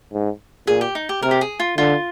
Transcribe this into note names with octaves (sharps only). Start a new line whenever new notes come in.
G#2
A#2 G#4
G4
D#4
G4
C3 A#4
G4
G#4
F4
D3 F4